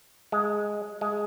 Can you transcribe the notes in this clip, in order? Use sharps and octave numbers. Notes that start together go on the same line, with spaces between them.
G#3
G#3